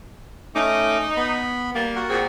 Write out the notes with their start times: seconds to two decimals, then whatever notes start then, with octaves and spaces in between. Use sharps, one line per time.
0.55 A3 C#4 D#4 D6
1.17 B3 B5
1.75 G3 A#3
1.96 F#4 A#4 F#5
2.10 A#2 C4 G#4